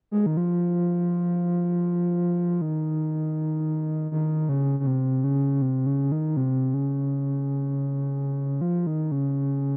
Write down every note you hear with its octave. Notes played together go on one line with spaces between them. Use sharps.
G#3
D#3
F3
D#3
D#3
C#3
C#3
C3
C#3
C3
C#3
D#3
C3
C#3
F3
D#3
C#3